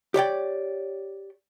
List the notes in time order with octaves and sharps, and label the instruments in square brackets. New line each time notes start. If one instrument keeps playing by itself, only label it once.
[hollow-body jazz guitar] G4 C#5 D5 G5